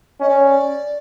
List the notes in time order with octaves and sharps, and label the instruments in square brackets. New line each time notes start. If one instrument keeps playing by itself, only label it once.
[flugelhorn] C#4 [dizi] D#5
[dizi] D5
C#5
D5